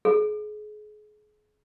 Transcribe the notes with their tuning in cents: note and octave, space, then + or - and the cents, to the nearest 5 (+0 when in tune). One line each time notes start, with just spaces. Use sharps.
G#4 +30